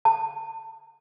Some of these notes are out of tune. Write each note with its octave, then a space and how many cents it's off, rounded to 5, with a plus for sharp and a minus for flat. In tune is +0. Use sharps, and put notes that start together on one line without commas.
A5 +30